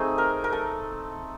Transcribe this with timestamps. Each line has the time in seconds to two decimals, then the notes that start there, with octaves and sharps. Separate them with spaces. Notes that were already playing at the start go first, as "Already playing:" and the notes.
Already playing: A3 C4 D#4 G#4
0.18 A#4
0.44 A#4
0.53 A4